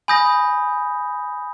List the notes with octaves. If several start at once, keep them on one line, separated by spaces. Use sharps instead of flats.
G#5 B5 D#6 G6 A#6